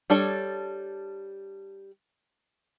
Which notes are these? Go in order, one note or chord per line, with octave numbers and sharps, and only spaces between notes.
G3 D4 A4 C#5